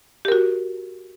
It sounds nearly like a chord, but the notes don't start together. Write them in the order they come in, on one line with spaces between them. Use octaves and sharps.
G4 A#4 F#4